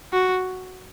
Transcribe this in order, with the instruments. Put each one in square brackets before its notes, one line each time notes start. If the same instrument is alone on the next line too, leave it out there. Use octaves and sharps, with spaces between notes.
[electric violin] F#4